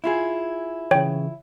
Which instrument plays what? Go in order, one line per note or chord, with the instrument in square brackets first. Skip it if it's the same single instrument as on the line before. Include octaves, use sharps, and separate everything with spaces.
[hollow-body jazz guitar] E4 F4 G#4
[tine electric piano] C#3 E3 [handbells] C#5 G5